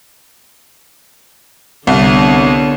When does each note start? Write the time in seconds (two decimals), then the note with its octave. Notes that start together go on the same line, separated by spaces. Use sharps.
1.87 C2 D3 B3 C#5